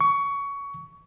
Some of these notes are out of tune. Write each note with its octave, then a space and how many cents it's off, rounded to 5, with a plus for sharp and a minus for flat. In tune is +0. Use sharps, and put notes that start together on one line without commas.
C#6 +20